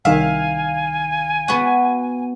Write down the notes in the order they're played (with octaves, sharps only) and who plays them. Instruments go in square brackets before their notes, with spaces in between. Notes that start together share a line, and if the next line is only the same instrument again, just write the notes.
[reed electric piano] C2 D#3 [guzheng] E5 [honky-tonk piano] F5 [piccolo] G#5
[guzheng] B3 F#4